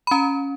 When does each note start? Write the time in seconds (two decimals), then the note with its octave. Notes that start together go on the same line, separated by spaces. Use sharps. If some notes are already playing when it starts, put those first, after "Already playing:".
0.07 B5
0.11 C#4 A#5